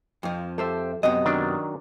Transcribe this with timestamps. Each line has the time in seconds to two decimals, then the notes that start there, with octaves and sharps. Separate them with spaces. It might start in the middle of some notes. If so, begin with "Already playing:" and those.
0.23 F2 F3
0.58 G4 A4 C5 E5
1.03 F#2 C3 B3 D#5
1.25 D#3 F#3 D4